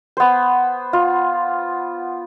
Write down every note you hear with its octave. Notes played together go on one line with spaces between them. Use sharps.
B3 C5
F4